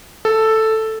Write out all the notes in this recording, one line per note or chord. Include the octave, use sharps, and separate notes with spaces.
A4